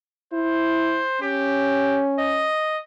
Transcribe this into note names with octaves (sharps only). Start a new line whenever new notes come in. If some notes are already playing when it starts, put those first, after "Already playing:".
E4 C5
C#4 G4
D#5